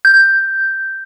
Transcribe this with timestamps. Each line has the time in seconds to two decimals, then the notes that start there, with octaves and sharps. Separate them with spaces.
0.05 G6